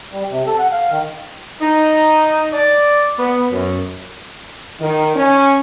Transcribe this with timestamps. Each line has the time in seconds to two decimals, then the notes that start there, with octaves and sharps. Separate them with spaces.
0.12 G3
0.31 C3
0.47 A4
0.59 F#5
0.72 F5
0.91 D#3
1.61 D#4
2.53 D5
3.19 B3
3.52 F#2
4.80 D#3
5.16 C#4